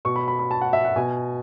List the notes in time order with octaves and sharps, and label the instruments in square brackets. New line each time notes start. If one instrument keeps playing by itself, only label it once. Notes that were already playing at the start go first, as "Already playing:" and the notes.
[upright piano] B2 C#6
B5
B5
B5
A5
F#5
E5
F#5
B2 G#5